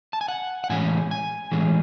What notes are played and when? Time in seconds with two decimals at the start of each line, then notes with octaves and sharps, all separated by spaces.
0.13 A5
0.21 G#5
0.28 F#5
0.64 F#5
0.70 A2 E3 G#3 C#4 G#5
1.11 G#5
1.52 A2 E3 G#3 C#4